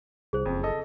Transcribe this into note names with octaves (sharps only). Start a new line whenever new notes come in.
C2 G#4 C5
F#1 F2
A4 D#5